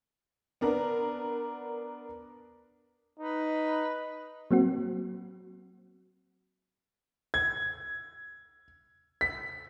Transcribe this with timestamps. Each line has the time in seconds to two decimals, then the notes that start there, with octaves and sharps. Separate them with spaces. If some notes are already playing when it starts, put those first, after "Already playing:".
0.61 B3 D4 A#4
3.19 D#4 B4
4.51 F#3 A#3 C4 F#4
7.34 G#6
9.21 B6